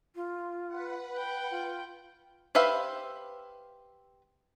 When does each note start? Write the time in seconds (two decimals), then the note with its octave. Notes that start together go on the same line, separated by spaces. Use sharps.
0.15 F4
0.68 B4 F#5
1.16 G5 B5
1.51 F4
2.55 G4 B4 C5 E5 F5